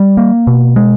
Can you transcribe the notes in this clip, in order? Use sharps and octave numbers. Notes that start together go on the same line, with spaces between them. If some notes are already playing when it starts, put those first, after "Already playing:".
Already playing: G3
A#3
B2
G#3